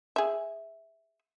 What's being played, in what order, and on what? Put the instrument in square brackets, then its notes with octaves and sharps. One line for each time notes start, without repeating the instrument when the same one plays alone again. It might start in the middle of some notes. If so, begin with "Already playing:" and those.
[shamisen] G#4 E5